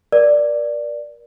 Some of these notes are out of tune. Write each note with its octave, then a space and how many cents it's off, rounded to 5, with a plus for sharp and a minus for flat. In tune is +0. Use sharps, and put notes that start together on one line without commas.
A#4 +35 D5 +0